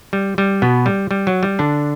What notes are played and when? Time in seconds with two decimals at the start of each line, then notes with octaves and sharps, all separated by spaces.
0.13 G3
0.38 G3
0.62 B2 B3
0.86 G3
1.11 G3
1.27 F#3
1.43 G3
1.59 D3 D4